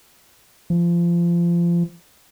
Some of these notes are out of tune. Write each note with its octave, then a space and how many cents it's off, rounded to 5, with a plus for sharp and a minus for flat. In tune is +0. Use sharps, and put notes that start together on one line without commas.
F3 -25